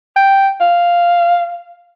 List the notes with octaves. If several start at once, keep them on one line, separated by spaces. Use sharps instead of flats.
G5
F5